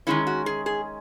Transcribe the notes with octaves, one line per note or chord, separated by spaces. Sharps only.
D#3 G#3 C#4 E4
F#4
G#4
G#4